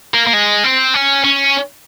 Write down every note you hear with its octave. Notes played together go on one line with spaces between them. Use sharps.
A#3
A#3
G#3
C4
C#4
C#4